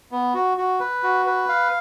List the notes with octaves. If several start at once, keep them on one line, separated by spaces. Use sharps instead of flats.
B3
F#4
F#4
B4
F#4
B4
F5